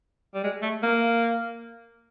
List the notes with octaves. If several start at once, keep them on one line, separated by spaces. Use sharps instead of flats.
G3
G#3
A3
A#3